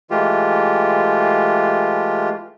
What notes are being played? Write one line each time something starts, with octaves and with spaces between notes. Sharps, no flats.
E3 G#3 A3 F4 G4